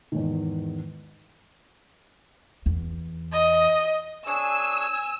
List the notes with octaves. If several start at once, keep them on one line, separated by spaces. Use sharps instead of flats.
E2 G#2 D#3
E2
D#5
D4 G#4 C#5 G#5 E6